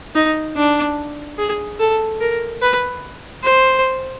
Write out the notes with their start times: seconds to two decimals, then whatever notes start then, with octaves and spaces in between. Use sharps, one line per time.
0.15 D#4
0.56 D4
1.38 G#4
1.80 A4
2.21 A#4
2.62 B4
3.44 C5